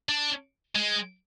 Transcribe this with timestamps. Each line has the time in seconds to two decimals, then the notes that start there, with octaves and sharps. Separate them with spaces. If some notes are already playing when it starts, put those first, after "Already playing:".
0.09 D4
0.75 G#3